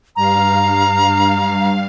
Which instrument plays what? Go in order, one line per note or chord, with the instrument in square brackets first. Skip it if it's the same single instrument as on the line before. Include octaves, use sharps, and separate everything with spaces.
[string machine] G2 F5 [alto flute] A#5